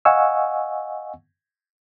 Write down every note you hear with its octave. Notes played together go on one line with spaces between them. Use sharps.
D#5 F5 F#5 G#5 C#6 E6